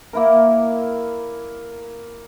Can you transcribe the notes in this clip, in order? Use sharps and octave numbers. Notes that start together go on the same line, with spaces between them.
A#3 E4 A#4